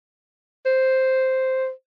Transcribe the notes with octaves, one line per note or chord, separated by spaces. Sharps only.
C5